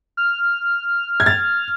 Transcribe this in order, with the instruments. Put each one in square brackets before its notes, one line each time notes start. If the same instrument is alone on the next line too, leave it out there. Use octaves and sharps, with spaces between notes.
[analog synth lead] F6
[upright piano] G#6
A6